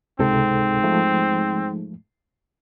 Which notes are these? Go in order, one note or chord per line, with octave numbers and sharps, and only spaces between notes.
C#2 G#2 C3 C4 A4
F3 A3